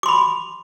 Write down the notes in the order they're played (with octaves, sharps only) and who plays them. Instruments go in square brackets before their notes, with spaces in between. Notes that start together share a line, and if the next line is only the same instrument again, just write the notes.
[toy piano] D6
C6
B5